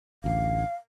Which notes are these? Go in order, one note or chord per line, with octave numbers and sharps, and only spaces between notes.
A1 D2 F5